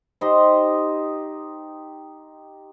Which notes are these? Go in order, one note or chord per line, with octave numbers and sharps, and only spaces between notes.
D#4 G4 C5 D#5